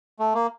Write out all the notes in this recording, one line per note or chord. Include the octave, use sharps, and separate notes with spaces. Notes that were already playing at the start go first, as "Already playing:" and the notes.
A3
A#3